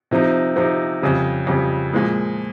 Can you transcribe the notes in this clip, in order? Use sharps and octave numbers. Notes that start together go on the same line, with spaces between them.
C3 F3 C4 D#4
C3 F3 C4 D#4
F2 C#3 G3
F2 C#3 G3
A#2 F3 G#3